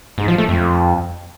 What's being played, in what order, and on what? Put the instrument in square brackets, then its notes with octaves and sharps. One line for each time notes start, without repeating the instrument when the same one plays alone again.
[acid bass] G#2
F3
A3
F2